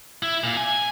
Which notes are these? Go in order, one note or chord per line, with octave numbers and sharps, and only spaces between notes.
E4
A#2
G#5